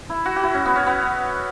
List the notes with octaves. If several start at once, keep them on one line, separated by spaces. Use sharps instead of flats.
E4
F#4
F#4
E4
C#4
B3
C#4
B3